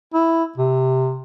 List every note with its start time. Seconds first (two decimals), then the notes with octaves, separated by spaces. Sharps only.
0.14 E4
0.58 C3